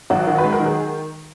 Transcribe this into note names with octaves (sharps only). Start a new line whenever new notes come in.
G#1 F#3 F#4
D#3
B4
G#3
A#4
D#3
G#4